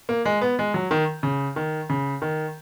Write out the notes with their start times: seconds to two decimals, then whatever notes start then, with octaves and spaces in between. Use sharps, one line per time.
0.09 A#3
0.25 G#3
0.41 B3
0.59 G#3
0.74 F#3
0.91 D#3
1.23 C#3
1.56 D#3
1.90 C#3
2.22 D#3